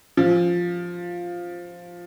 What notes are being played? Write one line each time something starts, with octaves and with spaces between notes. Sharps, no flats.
F3